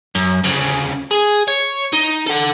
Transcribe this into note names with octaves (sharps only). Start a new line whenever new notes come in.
F#2
D2 C#3
G#4
C#5
D#4
A4 F#5